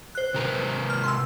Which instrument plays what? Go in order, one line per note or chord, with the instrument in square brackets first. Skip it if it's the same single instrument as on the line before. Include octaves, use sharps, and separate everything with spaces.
[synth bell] C5 F#6
[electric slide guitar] C3 A#4 B4
[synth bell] F6
C6 E6